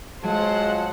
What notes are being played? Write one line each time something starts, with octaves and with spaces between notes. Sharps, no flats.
F#3 G#3 F4 C5 F#5 A5